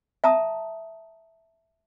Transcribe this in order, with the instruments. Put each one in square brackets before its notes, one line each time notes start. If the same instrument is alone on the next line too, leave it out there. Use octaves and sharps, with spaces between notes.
[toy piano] E5 A5 A#5 D#6